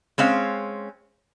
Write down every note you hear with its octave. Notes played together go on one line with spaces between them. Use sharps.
G#3 C4 C#4 F5